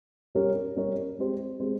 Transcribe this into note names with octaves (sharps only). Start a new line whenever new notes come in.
G3 C#4 G4 A#4 C#5
G3 C#4 G4 A#4 C#5
G#3 C4 G4 C5
G#3 C4 G4 C5